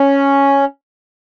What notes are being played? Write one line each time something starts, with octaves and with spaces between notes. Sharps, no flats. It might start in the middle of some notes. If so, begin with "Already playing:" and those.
Already playing: C#4